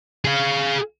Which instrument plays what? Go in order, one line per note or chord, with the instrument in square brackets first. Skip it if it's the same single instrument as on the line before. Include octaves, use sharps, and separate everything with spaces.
[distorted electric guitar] G#4 F5